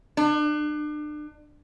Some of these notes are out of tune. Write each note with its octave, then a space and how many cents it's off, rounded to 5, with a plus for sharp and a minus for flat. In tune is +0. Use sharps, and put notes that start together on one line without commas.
D4 +35